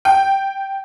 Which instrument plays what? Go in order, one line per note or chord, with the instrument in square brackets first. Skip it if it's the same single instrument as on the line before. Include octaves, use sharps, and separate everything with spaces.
[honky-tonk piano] G5